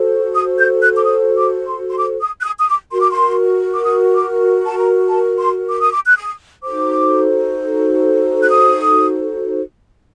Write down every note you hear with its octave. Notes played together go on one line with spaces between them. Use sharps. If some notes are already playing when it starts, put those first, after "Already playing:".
Already playing: F#4 A4 C5
D#6
G6
F#6
D6
D#6
D6
C6
C6
D6
D#6
F#6
D#6
D#6
D6
F#4 A#4 C6
D6
C6
D6
D#6
D6
A5
A#5
A5
C6
D6
D#6
D6
F#6
D#6
D#4 F#4 A4 C5 D6
F#6
D#6